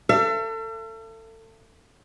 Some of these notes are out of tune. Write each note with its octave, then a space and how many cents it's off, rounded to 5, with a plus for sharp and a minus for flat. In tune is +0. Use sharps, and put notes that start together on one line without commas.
A4 +30 E5 +45